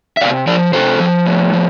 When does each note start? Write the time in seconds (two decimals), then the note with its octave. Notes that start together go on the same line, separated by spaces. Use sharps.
0.17 E5
0.21 C3 D5 F5
0.47 F3 A#4 D5
0.73 C3 A4 C5
1.00 F3
1.26 A2
1.53 F3